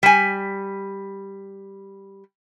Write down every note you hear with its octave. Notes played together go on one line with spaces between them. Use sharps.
G3 G#5